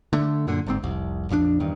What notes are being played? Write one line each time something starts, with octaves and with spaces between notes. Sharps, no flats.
D3 A3
F#2 A#2 D3
G1 G#2 C4
F1 C2
A#1 F2 D3 D4
E2 G2 D#3